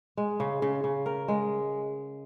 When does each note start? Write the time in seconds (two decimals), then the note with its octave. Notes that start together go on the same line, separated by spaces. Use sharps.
0.17 G#3
0.40 C#3
0.62 C#3
0.84 C#3
1.06 A#4
1.28 G#3